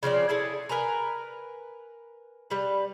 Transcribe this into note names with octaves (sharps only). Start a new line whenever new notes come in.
C#3 F3 C4 D5
E4 G#4 A4
A#4 B4 G#5 A#5
G3 B4